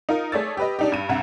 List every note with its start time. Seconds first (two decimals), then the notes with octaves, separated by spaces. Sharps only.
0.09 D#4 F4 A#4
0.32 A3 G#4 C#5 D5 E6 A6
0.57 G4 B4 D#5
0.79 D4 D#4 G4
0.92 G2 D#7
1.09 C2 G2 E5 F#5